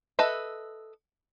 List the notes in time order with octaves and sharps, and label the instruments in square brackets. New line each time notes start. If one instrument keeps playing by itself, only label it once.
[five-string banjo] A4 B4 D#5 E5